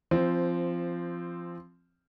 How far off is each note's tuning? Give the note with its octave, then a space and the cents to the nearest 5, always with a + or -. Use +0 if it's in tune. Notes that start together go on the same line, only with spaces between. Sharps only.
F3 -15 C4 +0